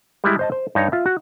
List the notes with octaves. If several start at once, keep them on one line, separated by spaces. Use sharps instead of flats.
G3 G#3 E4
C5 D#5 A5
C5
G2 D#4 C#5 A#5
F4 E5
F#4